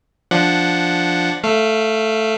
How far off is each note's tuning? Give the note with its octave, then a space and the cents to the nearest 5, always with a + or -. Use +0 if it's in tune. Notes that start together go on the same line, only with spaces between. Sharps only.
F3 +0 D4 +0 F#5 +0
A3 +0 F5 -15